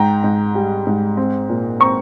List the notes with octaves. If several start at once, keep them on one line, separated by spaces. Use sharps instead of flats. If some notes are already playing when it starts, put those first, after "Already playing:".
Already playing: G#2 G5 A#5
G#2
G3
G#2
C4
A#2
C4 A#5 C#6